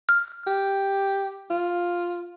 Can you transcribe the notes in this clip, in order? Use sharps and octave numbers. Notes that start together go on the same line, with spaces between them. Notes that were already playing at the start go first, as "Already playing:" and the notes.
F6
G4
F4